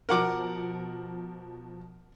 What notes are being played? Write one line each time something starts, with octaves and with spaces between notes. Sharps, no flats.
B2 F3 A#4 F#5 D6